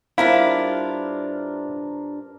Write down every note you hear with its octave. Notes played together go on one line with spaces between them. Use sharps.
G2 D4 E4 F4 A#4 C5 F5 A#5